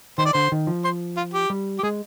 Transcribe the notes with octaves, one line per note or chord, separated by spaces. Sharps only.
D#3 C5
D5
D3 C5
D#3
F3
C5
F4
G4
G3
G4
G#3 G#4